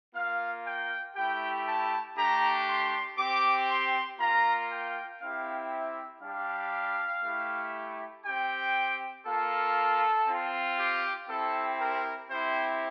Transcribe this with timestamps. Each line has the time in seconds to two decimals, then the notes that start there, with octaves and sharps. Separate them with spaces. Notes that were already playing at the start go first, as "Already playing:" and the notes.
0.15 A#3 F4 F5
0.66 G5
1.16 A3 E4 G4 G5
1.66 A5
2.17 A3 D4 G4 A#5
2.68 C6
3.18 C4 G4 D6
3.70 C6
4.20 A#3 F4 A#5
4.70 G5
5.21 C4 E4 G4 F5
5.72 E5
6.22 G3 D4 G4 F5
7.24 A3 E4 G4
8.25 C4 G4 G5
9.26 A#3 F4 A4
10.27 C4 F4
10.78 G4
11.29 C4 E4 G4 A4
11.79 A#4
12.30 C4 E4 G4 C5